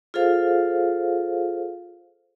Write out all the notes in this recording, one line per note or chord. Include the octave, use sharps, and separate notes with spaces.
F4 G#4 A4 C5 F5